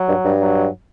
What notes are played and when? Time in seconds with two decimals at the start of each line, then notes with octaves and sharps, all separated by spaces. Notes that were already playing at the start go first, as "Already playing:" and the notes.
Already playing: F#3
0.09 G2
0.25 G2
0.40 F#3